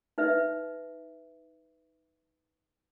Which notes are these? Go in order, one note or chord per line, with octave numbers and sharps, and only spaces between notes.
D#4 B4 E5